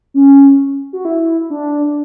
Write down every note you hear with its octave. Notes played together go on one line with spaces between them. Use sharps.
C#4
F#4
E4
D4